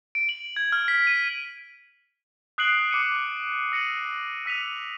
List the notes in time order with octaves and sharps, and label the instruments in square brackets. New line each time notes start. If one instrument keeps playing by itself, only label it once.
[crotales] D7
F#7
G#6
F6
B6
D#7
D#6 F#6 C7 D7 F#7
D6 C#7 D#7
E6 A#6 C#7 D#7 F#7
E6 B6 D#7 F7